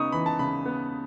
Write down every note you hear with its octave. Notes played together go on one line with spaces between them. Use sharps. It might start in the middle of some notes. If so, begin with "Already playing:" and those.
Already playing: C#3 B3 D#4 C#6 D#6
E3 B5
A5
C#3 B5
B3